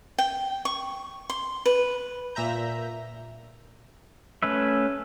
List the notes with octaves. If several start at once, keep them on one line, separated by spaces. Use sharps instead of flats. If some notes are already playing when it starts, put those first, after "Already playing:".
G5
C#6
C6
B4
A#2 E5 A#5 G6
A3 C#4 B4 E5